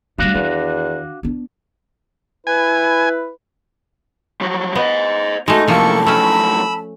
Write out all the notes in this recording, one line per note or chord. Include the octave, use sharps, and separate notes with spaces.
G3 A3 D4 F#4 F5
E2 D#3
B3 D4
E4 B4 G#5
F3 F#3
B3 C5 D#5
G#3 A3 D#4 F#4
F#2 A2 C3 F3 A#3 A4 A5 C#6
A3 C#4 B5 E6